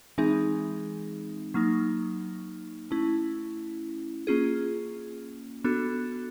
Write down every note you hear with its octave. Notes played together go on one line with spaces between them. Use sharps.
E3 G#3 C4 D#4 G#4
F#3 A#3 D#4
A3 C#4 E4
A#3 C#4 F4 G#4
B3 D4 F#4 A4